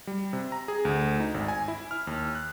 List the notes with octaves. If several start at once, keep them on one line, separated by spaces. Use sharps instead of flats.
G3
C3
A#5
G#4
D2
D#4
G#1
G#5
E4
F6
D#2
F#6